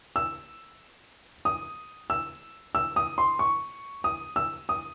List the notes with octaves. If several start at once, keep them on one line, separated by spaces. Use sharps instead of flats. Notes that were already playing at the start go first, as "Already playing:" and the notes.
E6
D#6
E6
E6
D#6
C6
C#6
D#6
E6
D#6